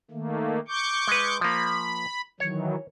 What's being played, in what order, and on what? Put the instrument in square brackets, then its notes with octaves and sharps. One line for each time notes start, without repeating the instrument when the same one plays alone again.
[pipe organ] D#3 A3 A#3
C#6 D6 G6
[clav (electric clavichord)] G#3 B4
[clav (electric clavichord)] F3 A#3 [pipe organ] B5
[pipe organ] D#3 E3 F#3 [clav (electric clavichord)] C#5